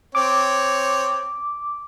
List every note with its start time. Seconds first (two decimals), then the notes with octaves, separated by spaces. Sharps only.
0.15 C4 C#5 D6